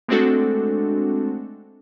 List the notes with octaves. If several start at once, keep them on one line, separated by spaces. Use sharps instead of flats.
G#3 A3 C4 D4 F#4 A4